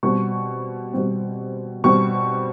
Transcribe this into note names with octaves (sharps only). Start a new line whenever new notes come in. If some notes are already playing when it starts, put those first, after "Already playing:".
B2 G3 C4 C#6
B2 G3 C4
B2 G3 C4 C#6